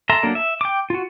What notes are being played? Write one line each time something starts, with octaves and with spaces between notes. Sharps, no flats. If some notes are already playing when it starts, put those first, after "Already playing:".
A4 E5 A#5 C6
F#3 A#3 D4 A4 A#4
E5
G5 D6
F4 F#4